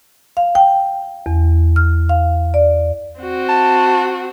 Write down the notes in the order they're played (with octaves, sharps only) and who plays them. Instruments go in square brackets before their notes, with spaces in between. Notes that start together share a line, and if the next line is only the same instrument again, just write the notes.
[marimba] F5
G5
E2
F6
F5
D5
[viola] C4 F#4
[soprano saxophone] A5